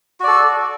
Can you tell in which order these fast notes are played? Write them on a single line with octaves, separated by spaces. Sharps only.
F#4 D5 A4